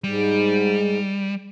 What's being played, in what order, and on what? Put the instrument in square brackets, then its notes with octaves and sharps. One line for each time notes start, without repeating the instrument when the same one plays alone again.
[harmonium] G#2 [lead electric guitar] G3